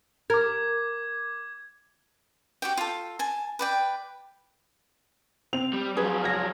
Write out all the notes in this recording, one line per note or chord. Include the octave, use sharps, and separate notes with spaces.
A#4 D6 G#6
F#4 G4 G5
F4 A4
G#5 A5
B4 D5 G5
C4 F7
G3
F3 F#3 G#4 B4
F6 G#6 A#6